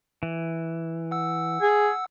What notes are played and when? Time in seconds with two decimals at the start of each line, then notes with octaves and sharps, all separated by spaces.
0.23 E3
1.11 F#5 E6
1.62 G#4